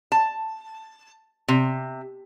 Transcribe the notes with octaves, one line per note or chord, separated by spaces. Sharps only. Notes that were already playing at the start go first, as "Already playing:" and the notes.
A5
C3